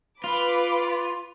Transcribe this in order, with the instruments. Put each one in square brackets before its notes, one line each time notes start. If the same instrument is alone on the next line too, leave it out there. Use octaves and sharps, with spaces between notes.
[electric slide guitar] F4 [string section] B4 B5 D6